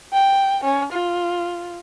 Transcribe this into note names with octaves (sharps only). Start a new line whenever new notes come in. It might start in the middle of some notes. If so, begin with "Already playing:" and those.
G5
C#4
F4